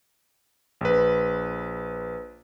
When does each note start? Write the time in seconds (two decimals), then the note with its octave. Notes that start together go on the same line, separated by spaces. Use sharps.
0.81 A#1 B4